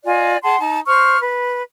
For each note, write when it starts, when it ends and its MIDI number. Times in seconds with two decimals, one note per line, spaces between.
0.05 0.37 65
0.05 0.37 74
0.05 0.37 75
0.05 0.37 80
0.42 0.57 68
0.42 0.57 78
0.42 0.57 81
0.42 0.57 84
0.60 0.79 63
0.60 0.79 81
0.86 1.18 72
0.86 1.18 85
0.86 1.18 89
1.20 1.60 71